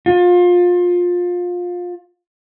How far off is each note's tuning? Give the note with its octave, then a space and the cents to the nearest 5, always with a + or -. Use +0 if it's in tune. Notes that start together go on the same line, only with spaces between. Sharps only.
F4 +25